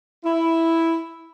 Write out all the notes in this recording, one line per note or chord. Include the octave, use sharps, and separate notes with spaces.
E4